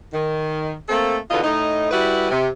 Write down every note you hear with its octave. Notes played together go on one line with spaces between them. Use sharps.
D#3
A3 A#3 C4 A4
E2 B2 D3 F4 D#5
A2 D#4
G3 E4 F#4 B4
C3